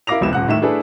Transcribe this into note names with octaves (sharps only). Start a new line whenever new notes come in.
E4 A#4 F5 D6 A#6 F7
F1 C#2 B3 E4 E7
D#1 F#5 F#6
A2 D#3 E5 E7
A3 D4 E4 G#4 A4 B4